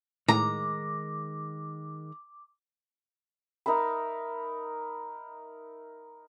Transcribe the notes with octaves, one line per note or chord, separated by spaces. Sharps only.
A2 D#3 G#3 A#5 D6
D#4 A#4 E5 B5